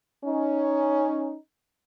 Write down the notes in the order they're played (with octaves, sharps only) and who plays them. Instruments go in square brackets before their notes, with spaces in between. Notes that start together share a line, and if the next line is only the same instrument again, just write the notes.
[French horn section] C#4 D#4